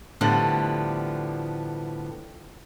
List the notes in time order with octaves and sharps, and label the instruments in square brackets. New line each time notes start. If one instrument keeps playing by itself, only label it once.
[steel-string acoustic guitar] A2 D3 F3 G3 B3